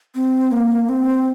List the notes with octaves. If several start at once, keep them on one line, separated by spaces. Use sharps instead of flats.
C4
A#3
C4